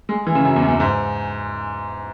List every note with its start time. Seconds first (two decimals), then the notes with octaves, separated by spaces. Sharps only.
0.09 G#3
0.27 E3
0.35 C#3
0.45 F#2
0.56 E2
0.62 F#2
0.68 E2
0.80 G#2